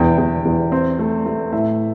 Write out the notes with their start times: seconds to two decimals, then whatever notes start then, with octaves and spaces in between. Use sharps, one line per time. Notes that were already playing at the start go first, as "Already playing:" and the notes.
Already playing: E1 E2 G5
0.18 E2
0.45 E2
0.72 C4
0.99 A3
1.26 A3
1.52 A2 E5